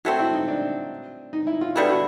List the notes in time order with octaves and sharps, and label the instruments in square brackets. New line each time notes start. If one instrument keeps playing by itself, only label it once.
[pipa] F#3 A3 C4 [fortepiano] F#4
[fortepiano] E4
D#4
D4
D#4
E4
F4
[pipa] D3 G3 B3 E4 [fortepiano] F#4
[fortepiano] F#4